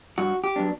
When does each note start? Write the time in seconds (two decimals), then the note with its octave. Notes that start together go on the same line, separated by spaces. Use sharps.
0.18 G2 F#4
0.44 G4
0.56 F#3 B3 D4